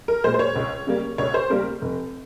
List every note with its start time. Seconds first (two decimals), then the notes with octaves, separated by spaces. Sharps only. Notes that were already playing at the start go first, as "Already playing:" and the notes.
0.08 A#4
0.24 A#2 G#3 C5
0.34 C5
0.39 C#5
0.56 C#2
0.87 C#3 G3 A#3
1.18 C#2 C#5
1.34 C5
1.50 C#3 G3 A#3 A#4
1.82 F1